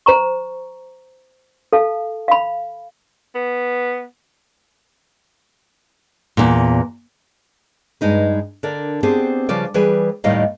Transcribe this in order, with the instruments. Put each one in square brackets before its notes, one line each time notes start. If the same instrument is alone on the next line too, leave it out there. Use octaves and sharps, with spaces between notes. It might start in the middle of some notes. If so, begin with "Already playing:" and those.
[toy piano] C5 A#5 C#6
A4 F5 A5
F5 B5
[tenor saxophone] B3
[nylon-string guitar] E2 A#2
G2 G#3 D#4 B4
D3 D4 A#4 D5
B3 C4 D4 G4 G#4 C5
C#3 F3 G3 B4 D5
E3 G3 G#4 B4
D#2 A2 D#3 G3 D#5 F5